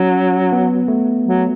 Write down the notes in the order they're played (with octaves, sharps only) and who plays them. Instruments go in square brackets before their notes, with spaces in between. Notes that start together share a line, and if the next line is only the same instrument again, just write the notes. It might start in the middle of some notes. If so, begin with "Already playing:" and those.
Already playing: [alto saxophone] F#3 [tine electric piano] C#4
[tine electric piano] B3
A3
[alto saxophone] F#3